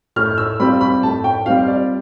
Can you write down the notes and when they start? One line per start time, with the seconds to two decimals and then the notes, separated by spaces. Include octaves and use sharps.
0.16 A2 F6
0.38 E6
0.60 G3 C4 F4 B5
0.81 B5
1.03 A2 A5
1.24 G5
1.46 G3 C4 F4 F5
1.68 D5